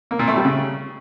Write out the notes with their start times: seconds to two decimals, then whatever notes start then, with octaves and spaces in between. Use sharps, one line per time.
0.11 A#3
0.19 A#2
0.28 A3
0.36 G3
0.45 C#3